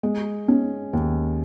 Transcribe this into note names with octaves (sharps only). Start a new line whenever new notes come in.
G#3
C#4
D#2